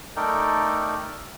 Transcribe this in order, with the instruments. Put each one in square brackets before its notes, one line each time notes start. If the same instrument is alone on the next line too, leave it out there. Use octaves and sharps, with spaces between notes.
[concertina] A3 D#4 A4 A#4 D5 G5